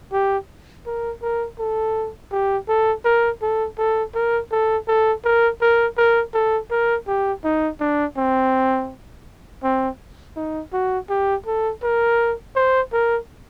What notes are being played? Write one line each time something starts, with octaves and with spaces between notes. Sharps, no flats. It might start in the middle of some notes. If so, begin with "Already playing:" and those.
G4
A#4
A#4
A4
G4
A4
A#4
A4
A4
A#4
A4
A4
A#4
A#4
A#4
A4
A#4
G4
D#4
D4
C4
C4
D#4
F#4
G4
A4
A#4
C5
A#4